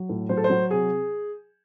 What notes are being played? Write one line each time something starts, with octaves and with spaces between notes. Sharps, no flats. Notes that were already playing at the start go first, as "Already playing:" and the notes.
Already playing: F#3
A2
F#3 C5
A4
C5
F#3
C3 G#4